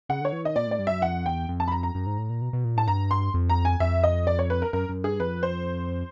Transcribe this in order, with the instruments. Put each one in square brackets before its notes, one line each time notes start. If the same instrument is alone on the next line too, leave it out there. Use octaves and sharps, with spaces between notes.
[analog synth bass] C#3 [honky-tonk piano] F#5
[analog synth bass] D3 [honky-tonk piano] C#5
[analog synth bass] E3
[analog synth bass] D#3 [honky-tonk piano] D#5
[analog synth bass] A#2 [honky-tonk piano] D5
[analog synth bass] A2 [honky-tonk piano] D5
[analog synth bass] G2
[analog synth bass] F#2 [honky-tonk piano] E5
[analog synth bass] F2 [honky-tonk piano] F#5
[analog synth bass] E2 [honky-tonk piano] G5
[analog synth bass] F2
[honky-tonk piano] A5
B5
A#5
A#5
[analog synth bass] F#2
G#2
A2
A#2
B2
B2
A#2
[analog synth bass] A2 [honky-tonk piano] A5
[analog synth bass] G2 [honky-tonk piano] A#5
[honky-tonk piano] C6
[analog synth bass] F2
[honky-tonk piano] A#5
G#5
[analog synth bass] F2 [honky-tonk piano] E5
[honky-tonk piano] D#5
D5
C#5
B4
A#4
[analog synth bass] F#2 [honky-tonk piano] A#4
[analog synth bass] F#2
[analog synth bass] G2 [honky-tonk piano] G#4
[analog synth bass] F2 [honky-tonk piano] B4
[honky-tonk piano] C5